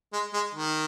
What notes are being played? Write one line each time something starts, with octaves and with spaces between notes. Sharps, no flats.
G#3
G#3
D#3